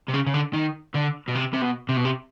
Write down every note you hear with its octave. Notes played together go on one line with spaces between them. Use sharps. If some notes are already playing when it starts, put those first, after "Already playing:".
C3
C#3
C#3
D3
D#3
D3
B2
C3
C3
B2
C3
B2
C3